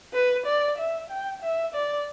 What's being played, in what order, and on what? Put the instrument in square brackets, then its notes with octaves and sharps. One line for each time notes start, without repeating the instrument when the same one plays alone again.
[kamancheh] B4
D5
E5
G5
E5
D5